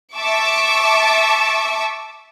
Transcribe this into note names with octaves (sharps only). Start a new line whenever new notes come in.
E5 A5 C#6 D6